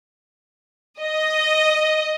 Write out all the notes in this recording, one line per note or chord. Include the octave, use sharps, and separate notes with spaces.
D#5